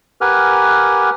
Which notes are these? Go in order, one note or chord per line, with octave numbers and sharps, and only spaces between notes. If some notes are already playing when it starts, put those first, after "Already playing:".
G4 A#4 B4 F#5 G#5 F6